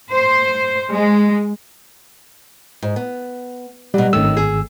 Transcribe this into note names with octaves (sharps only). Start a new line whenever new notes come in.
C5
G#3
G#2
B3
B2 F#3 G3
G#1 D#3 A3 C#4 E6
G#4